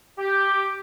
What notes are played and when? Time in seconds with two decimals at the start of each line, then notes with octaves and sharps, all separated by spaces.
0.18 G4